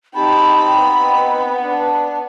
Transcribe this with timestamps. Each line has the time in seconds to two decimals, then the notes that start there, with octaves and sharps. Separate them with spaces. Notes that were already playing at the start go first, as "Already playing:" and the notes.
0.15 C4 D#4 G4 A5 B5
0.78 B3
1.61 D4